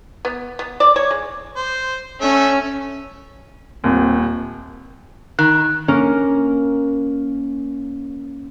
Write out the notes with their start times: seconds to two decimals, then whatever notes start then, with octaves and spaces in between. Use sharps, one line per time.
0.25 B3
0.59 B3
0.80 D5
0.96 C#5
1.11 G#3
1.56 C5
2.21 A3 C#4 E5
3.84 D#1 D#2 C4
5.39 D#3 F#6
5.88 A#3 C#4 A#4